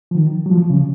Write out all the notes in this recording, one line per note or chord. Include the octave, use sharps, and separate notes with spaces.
F3
D#3
F#3
F3
C#3